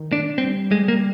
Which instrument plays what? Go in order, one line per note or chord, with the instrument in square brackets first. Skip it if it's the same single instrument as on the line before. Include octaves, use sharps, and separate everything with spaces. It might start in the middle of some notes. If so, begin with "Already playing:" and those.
Already playing: [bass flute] D#3
[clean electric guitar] D4
[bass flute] G3 [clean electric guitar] C4
[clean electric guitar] G#3
A#3